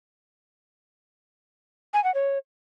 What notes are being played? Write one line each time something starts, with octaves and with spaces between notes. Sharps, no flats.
G#5
F#5
C#5